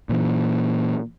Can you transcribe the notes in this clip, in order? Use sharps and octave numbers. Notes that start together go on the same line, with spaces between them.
A#2 E3